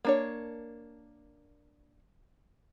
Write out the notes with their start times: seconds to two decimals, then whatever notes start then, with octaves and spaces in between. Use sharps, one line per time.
0.05 A#3 D4 C#5